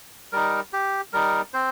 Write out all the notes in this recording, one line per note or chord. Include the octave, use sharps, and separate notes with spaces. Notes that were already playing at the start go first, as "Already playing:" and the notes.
G3 D#4 A#4
G4
G3 D#4 A#4
C4 C5